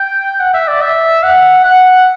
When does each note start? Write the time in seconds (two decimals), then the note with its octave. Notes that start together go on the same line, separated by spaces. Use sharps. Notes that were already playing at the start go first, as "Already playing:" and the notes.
Already playing: G5
0.40 F#5
0.54 E5
0.68 D5
0.82 E5
1.23 F#5
1.64 F#5